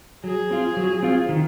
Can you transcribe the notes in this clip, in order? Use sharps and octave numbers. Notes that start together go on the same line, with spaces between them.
F#3 G#4
C4 F4
F#3
C4 F4
D#3